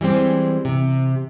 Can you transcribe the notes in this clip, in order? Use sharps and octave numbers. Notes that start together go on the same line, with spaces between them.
E3 G3 G#3 C4
C3